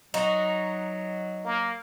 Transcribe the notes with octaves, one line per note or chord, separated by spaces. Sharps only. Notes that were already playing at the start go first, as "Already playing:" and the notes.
F#3 D#4 F#4
A#3